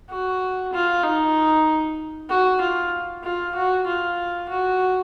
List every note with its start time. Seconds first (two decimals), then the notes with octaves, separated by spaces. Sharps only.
0.10 F#4
0.72 F4
1.03 D#4
2.29 F#4
2.61 F4
3.23 F4
3.55 F#4
3.86 F4
4.49 F#4